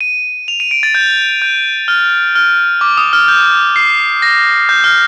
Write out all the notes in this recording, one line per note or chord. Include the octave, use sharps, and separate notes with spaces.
D#7
F7
D#7
D7
A6
G6
G6
F6
F6
D6
D#6
F6
G6
C7
A#6
G6
F6